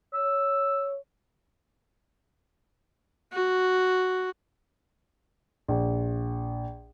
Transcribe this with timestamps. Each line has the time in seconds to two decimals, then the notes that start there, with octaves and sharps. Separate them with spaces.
0.14 C#5 E6
3.32 F#4
5.68 A#1